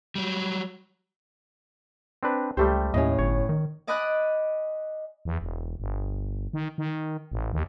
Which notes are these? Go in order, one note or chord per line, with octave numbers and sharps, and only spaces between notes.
F#3 G3
C4 D4 B4
C#2 G3 A3 G4 C5
D#2 A2 C#4 D#5
G1 C#5
D#3
D5 D#5 G#5 B5 D#6 F#6
E2
E1
G1
D#3
D#3
A1
D#2